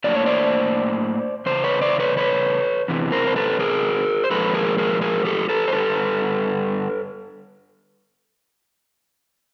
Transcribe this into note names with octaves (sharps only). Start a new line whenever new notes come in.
A2 F#3 A#3 D4 D5
C#5
C5 D5
E2 C#3 C5
B4 C#5
C5 D5
B4 C#5
B4 C#5
E2 C3 E3
A#4 C5
C5
A4 B4
G#4 A#4
C5
A#2 F3 G#3 A4 B4
G#4 A#4
G#4 A#4
G#4 A#4
G4 A4
A4 B4
C5
G2 D3 G3 A4 B4